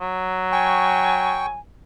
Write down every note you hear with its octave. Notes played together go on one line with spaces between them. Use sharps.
F#3
G5 G#5 C#6